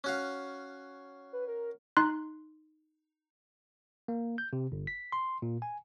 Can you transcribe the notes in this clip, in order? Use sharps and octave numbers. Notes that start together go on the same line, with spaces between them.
C#4 F#4 F5
B4
A#4
D#4 C6 F#6
A#3
G6
C3
G1
B6
C6
A#2
G#5